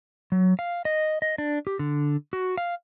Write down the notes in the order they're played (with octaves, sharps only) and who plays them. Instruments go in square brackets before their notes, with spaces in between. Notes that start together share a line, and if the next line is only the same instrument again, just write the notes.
[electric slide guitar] F#3
F5
D#5
D#5
D4
G4
D3
F#4
F5